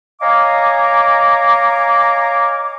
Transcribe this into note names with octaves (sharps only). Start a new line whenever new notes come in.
C#5 D#5 F5 G#5 A#5 D6